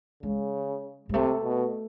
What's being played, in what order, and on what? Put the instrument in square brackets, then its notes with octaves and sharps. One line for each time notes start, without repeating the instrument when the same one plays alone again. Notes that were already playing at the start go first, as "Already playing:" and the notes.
[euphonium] C#3 [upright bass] G#3
[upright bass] G#3
[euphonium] C3 [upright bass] A3
[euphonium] B2